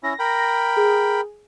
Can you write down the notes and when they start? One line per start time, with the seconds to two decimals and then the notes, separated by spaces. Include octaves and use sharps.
0.03 C#4 E4 A#6
0.19 A#4 G5 B5
0.77 G#4